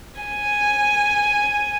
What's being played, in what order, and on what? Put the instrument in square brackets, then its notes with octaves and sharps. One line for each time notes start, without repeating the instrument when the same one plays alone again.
[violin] G#5